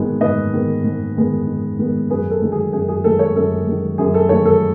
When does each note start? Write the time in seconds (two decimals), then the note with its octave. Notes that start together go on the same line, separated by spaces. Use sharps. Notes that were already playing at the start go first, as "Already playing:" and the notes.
Already playing: G#2 D#3 G#3 B3
0.21 G#2 B4 D#5
0.53 D#3 G#3 B3
0.84 G#2
1.16 D#3 G#3 B3
1.47 G#2
1.78 D#3 G#3 B3
2.10 F#2 G#4 B4
2.31 A4
2.42 D#3 G#3
2.52 G#4
2.73 F#2 G#4
2.89 G#4
3.04 D#3 G#3 A4
3.19 A4 C#5
3.36 F#2 A4
3.67 D#3 G#3
3.98 F#2 G#4
4.14 A4
4.29 D#3 G#3 A4 C#5
4.46 A4